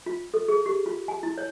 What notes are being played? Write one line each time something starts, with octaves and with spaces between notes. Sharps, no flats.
F4
A4
G#4
G4
F4
G#5
E4
C#5